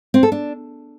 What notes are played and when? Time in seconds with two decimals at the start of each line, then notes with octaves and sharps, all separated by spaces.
0.14 C4
0.23 A4
0.32 D4